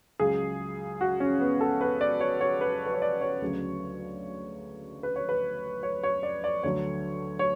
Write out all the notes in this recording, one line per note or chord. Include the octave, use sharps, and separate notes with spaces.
C#2 C#3 F#3 G#4
F#4
C#4
B3
A4
B4
D5
C#5
C#5
B4
B4
C#5
D5
C#5
D2 C#3 F#3
B4
C#5
B4
C#5
C#5
D5
D5
D2 D3 F#3 C#5
C#5